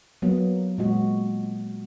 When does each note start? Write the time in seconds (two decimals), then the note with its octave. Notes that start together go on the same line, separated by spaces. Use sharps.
0.22 F#3 A#3 B3
0.78 A#2 G#3 F#4